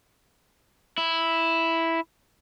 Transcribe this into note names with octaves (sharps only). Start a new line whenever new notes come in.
E4